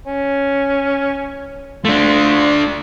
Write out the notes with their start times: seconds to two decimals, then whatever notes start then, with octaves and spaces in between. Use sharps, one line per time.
0.07 C#4
1.85 A3 D4 F4